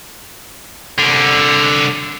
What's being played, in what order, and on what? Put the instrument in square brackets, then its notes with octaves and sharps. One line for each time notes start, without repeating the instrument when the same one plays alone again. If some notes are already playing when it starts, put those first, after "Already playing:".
[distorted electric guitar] C2 D3